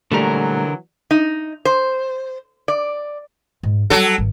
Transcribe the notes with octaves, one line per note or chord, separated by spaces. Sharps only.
A#2 D3 E3 F#3 G3 A3 A#4
D#4
C5
D5
G#2
F#3 G3 A4
G#1